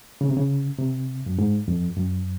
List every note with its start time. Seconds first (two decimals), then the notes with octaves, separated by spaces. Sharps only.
0.21 C#3
0.29 C3
0.37 C#3
0.79 C3
1.26 F#2
1.38 G#2
1.68 F2
1.96 F#2